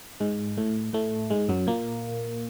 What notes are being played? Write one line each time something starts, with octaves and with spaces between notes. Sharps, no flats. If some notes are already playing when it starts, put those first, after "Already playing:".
G#2 G#3
A2 A3
A2 A3
G#2 G#3
F#2 F#3
A#2 A#3